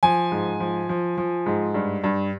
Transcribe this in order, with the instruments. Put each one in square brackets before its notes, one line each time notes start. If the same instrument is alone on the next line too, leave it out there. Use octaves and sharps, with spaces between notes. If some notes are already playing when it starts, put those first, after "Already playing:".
[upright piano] F3 G#5
G#2
F3
F3
F3
G#2
G2
G2